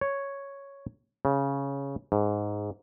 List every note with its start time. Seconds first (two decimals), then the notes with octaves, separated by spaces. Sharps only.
0.01 C#5
1.25 C#3
2.12 G#2